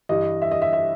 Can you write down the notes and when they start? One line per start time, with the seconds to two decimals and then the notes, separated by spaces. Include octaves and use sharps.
0.09 G2 E3 G3 D#5
0.42 E5
0.51 D#5
0.62 E5
0.73 E5